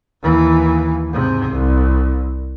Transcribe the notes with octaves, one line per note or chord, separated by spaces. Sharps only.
D#2 E3
G#2 C3
C2